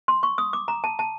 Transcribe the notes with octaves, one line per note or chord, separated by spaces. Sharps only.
C6
C#6
D#6
D6
A#5
A5
A5